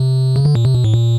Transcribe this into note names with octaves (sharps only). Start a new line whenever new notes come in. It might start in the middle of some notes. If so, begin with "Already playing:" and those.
Already playing: C3
C#3
D3
A#2
C3
B2
A2
A#2